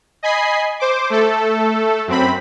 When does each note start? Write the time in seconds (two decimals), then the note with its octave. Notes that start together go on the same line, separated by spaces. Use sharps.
0.23 D#5 G#5 B5 C7
0.80 C5 D6
1.10 A3 A4
2.08 F#2 C4 B5